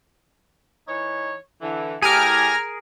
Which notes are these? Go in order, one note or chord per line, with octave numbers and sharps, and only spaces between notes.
E3 D#4 C#5
D3 E3
A2 G4 G#4 A#4 G#5 A#5 F6